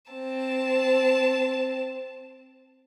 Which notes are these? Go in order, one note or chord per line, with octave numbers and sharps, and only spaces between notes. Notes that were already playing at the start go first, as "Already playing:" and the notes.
C4 A5